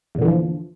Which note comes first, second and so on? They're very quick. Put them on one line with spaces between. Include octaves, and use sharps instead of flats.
E2 A#2 D3 E3 F3